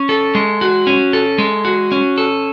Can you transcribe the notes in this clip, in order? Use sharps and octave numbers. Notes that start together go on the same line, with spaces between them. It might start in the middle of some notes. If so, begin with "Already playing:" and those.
Already playing: C#4
A4
G#3
F#4
C#4
A4
G#3
F#4
C#4
A4